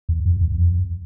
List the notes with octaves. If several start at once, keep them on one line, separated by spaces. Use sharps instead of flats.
E2
F2
E2
E2
F2